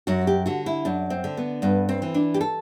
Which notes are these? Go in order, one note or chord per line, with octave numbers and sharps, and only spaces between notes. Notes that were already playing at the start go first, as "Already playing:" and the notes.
F#2 F#4
G4
D3 F#4
E4
F#2 D4
C4
D3
B3
G2 B3
C4
E3
D4
G4
A4